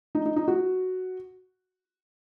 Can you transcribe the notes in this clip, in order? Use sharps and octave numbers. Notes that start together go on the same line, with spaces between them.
D#4
D#4
D#4
F#4